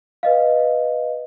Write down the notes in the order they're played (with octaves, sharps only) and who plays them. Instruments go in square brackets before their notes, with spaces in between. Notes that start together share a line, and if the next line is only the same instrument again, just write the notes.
[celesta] B4 D#5 F5